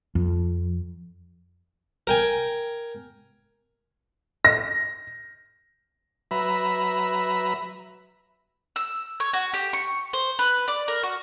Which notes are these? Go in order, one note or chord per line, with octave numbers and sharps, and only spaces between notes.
F2
A#4 G5 G#5
A#6
F#3 B4 E5 A#5 B5
E6
C#5
F#4
G4
C#6
C5
B4
D5
A#4
F#4